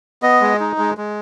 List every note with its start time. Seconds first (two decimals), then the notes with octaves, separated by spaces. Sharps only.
0.22 B3 D#5
0.41 G#3
0.60 D#4
0.78 G#3
0.97 G#3